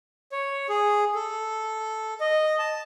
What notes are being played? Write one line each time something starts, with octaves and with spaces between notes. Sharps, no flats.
C#5
G#4
A4
D#5
A5